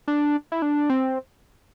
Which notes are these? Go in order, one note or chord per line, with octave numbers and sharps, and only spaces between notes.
D4
E4
D4
C4